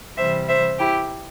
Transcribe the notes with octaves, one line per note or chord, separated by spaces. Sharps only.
C3 E3 G3 C5 E5
C5 E5
E4 G4